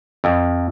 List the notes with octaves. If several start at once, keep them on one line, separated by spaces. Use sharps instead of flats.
F2